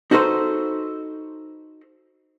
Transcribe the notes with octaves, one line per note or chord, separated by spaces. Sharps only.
D#4 F#4 A4 B4 C5